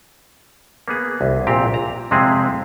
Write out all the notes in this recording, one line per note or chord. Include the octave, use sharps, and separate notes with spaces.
A#3 B3 G#4
C2
A#1 A#2 C4 G4 A#5
A#5
F2 C3 G#3 C4 E4 G#4